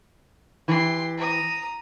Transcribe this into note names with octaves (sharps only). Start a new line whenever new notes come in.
E3 G4 C6
A#5 D#6